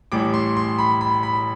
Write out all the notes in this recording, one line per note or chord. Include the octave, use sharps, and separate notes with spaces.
A1 A2 G3 D6
C6
C6
B5
B5
B5